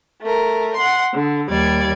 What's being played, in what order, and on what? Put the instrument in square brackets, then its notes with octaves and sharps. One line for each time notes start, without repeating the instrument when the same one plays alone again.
[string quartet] A3 A#4
F#5 C6
D3
D#2 G3 D5 G#6